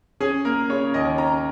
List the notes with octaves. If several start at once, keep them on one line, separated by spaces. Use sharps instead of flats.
C#4 G#4
A#3 A#4
C#3 C#5
D#2 D#5
C#4 A#5